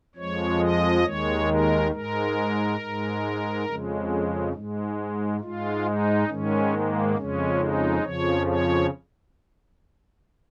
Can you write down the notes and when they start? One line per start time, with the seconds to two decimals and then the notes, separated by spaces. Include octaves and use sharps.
0.15 F2 F3 G#3 C#5
0.60 D#5
1.03 D#2 D#3 G#3 C#5
1.47 A#4
1.91 G#2 G#3 A#4
2.79 G#2 G#3
3.66 F2 C#3 G#3
4.53 G#2 G#3
5.40 G#2 G#3 F4
5.84 D#4
6.28 G#2 D#3 G#3 C#4
6.71 A#3
7.15 F2 C#3 G#3 C#4
7.59 D#4
8.02 F2 C#3 F3 C#5
8.47 C#5